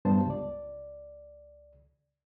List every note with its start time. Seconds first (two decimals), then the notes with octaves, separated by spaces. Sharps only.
0.05 G2 B3 C5 A5
0.26 C#2 D5